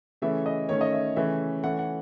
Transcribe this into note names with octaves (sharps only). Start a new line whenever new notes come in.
C#3 E3 A3 C#4 E5
D#5
D#3 A3 C#4 C#5
D#5
E5
C#3 E3 A3 C#4 E5
E3 A3 C#4 F#5
F#5